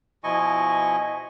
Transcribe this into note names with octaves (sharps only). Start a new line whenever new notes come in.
B2 F3 E4 D#5 G#5 C#6